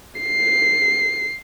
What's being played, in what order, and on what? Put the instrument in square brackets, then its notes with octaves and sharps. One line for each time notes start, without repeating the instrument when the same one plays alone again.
[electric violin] C7